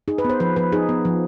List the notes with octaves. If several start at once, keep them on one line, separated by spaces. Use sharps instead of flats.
D#4 G#4
B4
B3 C5
F3 B4
F3 B4
D#4 G#4
B3
F3